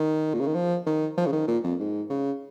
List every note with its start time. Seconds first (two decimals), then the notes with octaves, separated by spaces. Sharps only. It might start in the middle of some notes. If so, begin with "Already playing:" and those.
Already playing: D#3
0.34 A#2
0.40 C#3
0.47 D#3
0.55 F3
0.87 D#3
1.17 F3
1.26 C#3
1.33 D#3
1.47 A#2
1.63 F2
1.80 G#2
2.10 C#3